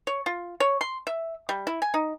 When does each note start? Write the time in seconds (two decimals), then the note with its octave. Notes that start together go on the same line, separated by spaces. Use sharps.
0.07 C#5
0.26 F4
0.60 C#5
0.81 C6
1.07 E5
1.49 G3
1.67 E4
1.82 G#5
1.94 D#4